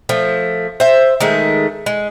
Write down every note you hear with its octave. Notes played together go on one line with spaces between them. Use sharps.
F3 A3
C5 E5
D#3 G#3 A3
G#3